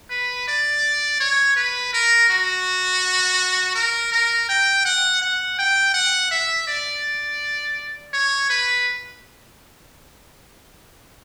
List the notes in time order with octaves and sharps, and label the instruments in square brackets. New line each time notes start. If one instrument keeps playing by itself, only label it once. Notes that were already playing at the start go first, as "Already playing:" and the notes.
[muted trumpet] B4
D5
C#5
B4
A#4
F#4
A#4
A#4
G5
F#5
F#5
G5
F#5
E5
D5
C#5
B4